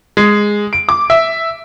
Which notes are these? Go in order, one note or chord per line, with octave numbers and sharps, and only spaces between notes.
G#3
D7
D6
E5